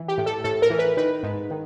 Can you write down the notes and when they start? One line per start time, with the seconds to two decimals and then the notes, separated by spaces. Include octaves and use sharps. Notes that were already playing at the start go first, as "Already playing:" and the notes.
Already playing: E3
0.08 G4
0.18 A2
0.26 A4
0.44 A2 A4
0.62 A#4
0.70 E3
0.79 B4
0.97 D#3 B4
1.23 G#2
1.50 D#3